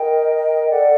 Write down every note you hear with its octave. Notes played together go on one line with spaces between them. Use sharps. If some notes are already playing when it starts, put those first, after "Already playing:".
Already playing: A#4 D#5 G5
A4 D5 F#5